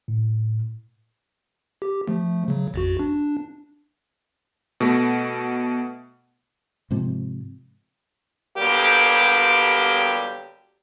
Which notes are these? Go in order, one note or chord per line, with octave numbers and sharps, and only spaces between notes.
A2
G4
F3 A3
C#3 F#3
A1 F2 F#4
D4
B2 A3
G#2 C3 F3
D3 F#3 G3 A#3 B3 G4